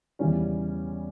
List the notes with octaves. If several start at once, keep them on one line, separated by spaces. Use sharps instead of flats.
E2 C#3 E3 G3 C#4